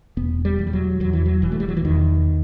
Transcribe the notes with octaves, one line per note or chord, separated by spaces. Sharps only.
E1 B3
G3
E2
G3
F#3
E2 F#3
E3
F#3
E1 E3
A3
G3
F#3
E3
E2 D#3